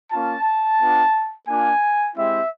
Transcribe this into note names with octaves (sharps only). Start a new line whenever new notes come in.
A#3 C#4 F4 A5
B3 D4 F4
A#3 D4 F4 G#5
G#3 C4 E4 G4 E5